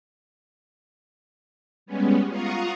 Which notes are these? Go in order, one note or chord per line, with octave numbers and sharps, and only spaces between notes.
G3 G#3 B3 C#4
F4 F5 F#5 A#5 C#6 D#6